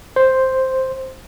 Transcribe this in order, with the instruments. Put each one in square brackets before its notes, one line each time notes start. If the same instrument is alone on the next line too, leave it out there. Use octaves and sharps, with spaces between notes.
[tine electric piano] C5